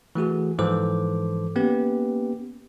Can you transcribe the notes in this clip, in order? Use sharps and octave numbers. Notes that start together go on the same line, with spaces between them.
E3 A3 F#4 G#4
G#2 E3 F3 A4 C5 D6
A#3 B3 C#4 G4 B4